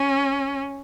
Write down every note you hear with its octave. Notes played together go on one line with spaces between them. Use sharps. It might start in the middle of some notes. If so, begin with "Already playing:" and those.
Already playing: C#4